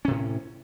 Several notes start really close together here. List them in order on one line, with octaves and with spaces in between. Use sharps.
C#4 C3 A2